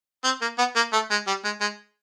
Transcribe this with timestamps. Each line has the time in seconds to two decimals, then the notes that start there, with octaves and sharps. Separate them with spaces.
0.24 C4
0.41 A#3
0.58 B3
0.76 A#3
0.93 A3
1.11 G#3
1.27 G3
1.45 G#3
1.61 G#3